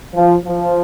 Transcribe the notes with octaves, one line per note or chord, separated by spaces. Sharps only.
F3
F3